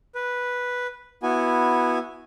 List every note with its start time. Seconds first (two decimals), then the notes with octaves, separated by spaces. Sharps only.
0.15 B4
1.23 B3 E4 F#4 G#5